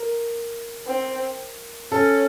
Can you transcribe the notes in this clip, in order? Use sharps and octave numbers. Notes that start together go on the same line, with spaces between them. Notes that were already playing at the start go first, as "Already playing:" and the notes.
Already playing: A#4
C4
C#4 A4